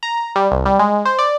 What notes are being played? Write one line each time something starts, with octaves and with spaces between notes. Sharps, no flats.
A#5
G3
C2
G3
G#3
C5
D5